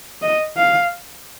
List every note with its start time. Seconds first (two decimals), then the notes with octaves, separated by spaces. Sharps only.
0.22 D#5
0.57 F5